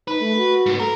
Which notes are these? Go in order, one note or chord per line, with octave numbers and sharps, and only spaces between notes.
D#4 B4
A3
F#4
G#2 B3
A4 A#4